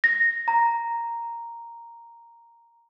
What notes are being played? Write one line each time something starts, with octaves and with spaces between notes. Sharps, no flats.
A#6
A#5